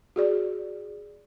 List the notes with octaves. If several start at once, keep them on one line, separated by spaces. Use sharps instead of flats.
F#4 G#4 D5